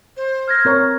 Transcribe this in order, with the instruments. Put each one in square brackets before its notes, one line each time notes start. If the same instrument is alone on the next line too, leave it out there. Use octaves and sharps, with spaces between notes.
[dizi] C5
[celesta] F6 G#6 A#6
[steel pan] C4 A#4 C#5